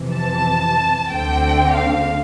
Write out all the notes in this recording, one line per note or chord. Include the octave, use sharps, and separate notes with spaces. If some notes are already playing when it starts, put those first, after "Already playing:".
Already playing: F2 C3 E3
A5
D2 D3 A3 C4 G5
F5